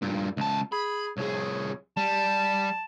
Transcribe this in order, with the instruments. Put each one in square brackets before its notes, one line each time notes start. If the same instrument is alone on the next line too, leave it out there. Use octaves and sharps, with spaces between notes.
[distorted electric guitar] G2 A#2
C#2 A5
[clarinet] G#4 [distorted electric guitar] B5
[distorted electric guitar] C2 G#4 [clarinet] C#5
[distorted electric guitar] G3 [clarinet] A5